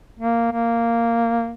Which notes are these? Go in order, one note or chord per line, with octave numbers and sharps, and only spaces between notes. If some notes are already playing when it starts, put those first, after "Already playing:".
A#3
A#3